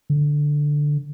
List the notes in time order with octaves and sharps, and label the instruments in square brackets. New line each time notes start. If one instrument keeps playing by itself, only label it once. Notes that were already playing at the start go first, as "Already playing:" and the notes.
[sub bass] D3